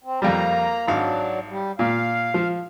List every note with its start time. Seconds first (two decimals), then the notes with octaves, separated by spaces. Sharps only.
0.04 C4
0.22 F2 G3 A#3 A#5
0.87 G#1 F#3 D4 F5
1.49 G3
1.79 A#2 F5
2.34 F3